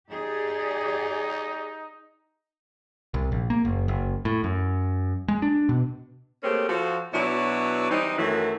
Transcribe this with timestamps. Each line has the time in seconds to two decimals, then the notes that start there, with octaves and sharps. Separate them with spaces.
0.10 D#4 G4 G#4 D5
3.14 C2
3.32 A#1
3.50 A#3
3.65 F#1
3.88 F#1
4.25 A2
4.44 F#2
5.28 G#3
5.42 D4
5.69 B2
6.43 A3 A#3 C4 C#4 G4 G#4
6.68 F3 F#4 A4
7.13 B2 F#3 D4 E4 B4 C#5
7.91 E3 G3 C4 D#4
8.18 F#2 D#3 E3 F#3 A3 E4